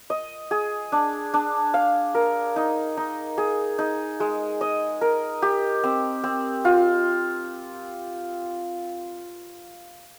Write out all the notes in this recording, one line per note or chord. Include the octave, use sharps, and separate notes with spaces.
D#5
G#4
D4
D4
F5
A#4
D#4
D#4
G#4
D#4
G#3
D#5
A#4
G4
C4
C4
F4